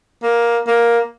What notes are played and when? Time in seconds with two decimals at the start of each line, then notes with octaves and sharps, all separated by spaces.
0.23 A#3
0.67 A#3